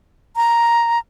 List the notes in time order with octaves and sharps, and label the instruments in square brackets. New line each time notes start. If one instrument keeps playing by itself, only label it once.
[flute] A#5